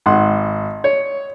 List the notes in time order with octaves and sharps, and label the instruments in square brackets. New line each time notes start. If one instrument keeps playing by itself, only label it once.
[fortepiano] G#1 F#5 C6
C#5